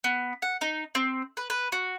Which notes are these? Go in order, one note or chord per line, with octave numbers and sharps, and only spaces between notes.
B3
F#5
D#4
C4
B4
B4
F#4